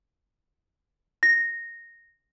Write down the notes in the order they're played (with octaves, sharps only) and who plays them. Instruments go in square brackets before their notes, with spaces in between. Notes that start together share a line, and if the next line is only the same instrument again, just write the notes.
[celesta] A#6